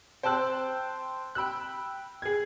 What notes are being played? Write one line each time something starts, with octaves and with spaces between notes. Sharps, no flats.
C5 G5 A5 E6 F#6
G5 B5 E6 F#6
G#4 G#6